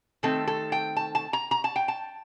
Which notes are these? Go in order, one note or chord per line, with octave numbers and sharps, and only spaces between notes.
D#3 A3 C4 A4
A4
G5
A5
A5
A#5
A#5
A5
G5
A5